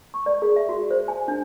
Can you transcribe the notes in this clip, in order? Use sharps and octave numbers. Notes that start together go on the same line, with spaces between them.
C#6
D5
G#4
E5
F#4
C5
G#5
D4